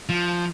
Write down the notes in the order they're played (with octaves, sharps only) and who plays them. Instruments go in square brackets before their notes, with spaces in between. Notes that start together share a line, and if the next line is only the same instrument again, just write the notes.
[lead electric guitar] F3